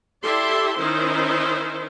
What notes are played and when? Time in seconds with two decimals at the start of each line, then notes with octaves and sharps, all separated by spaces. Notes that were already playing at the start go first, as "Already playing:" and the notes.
0.22 E4 G4 A4 D5 E5 C6
0.77 D#3 C#4 D#4 E4 C5